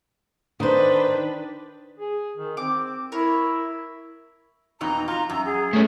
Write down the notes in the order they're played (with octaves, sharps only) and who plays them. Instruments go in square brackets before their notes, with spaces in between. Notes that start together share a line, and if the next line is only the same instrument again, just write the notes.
[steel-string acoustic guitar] D#3 C5 [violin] D4 B4
[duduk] G#4
D#3
[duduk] C4 [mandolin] D6
[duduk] E4 [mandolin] A#4 C#5
[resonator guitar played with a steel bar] F2 B2 D#4 [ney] A#5
[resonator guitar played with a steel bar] F4 [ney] A#5
[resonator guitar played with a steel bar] F#2 [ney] A#5
[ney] G#4
[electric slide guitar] A3 C#4